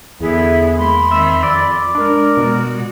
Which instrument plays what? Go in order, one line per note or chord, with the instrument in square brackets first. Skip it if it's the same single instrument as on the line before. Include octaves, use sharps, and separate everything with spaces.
[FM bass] E2 [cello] D3 B3 [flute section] E4 G#4 E5
[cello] G#3 A#3 [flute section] B5 C6
[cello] D#3 C4 [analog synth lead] E5
[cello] F2 [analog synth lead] D5
[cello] G#3 [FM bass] D4 [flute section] A#4
[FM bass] B2 [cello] G#3 F#4